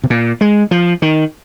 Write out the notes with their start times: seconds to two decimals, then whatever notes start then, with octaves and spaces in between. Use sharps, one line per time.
0.04 C3
0.10 A#2
0.41 G#3
0.71 F3
1.02 D#3